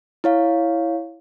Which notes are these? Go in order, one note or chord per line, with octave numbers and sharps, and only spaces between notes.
E4 C#5 F5